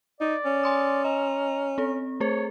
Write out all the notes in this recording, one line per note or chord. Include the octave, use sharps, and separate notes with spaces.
D#4 D5
C#4
G#5 C6 D#6
D#5 A#5
C4 A4
A3 G#4 C5 C#5